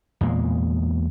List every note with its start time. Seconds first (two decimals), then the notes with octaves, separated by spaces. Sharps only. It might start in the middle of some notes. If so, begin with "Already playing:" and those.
0.21 E2 A#2 G#3